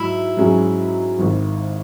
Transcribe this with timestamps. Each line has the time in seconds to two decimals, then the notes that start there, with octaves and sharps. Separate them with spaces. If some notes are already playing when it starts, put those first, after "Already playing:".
Already playing: G#2 F#3 E4
0.37 G#2 F#3 C#4 G#4
1.19 G#1 G#2 D#3